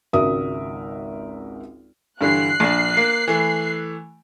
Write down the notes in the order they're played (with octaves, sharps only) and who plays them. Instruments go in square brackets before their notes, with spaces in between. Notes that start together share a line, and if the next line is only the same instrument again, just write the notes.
[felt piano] G#1 C#2 F#4 A#4 E5 D#6
[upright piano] G2 D3 E3 [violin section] F#6 C7
[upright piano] A#1 D4
A#3
E3 A3